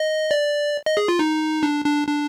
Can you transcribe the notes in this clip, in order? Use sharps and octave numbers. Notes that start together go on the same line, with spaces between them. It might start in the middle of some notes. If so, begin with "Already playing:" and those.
Already playing: D#5
D5
D#5
G#4
F4
D#4
D4
D4
D4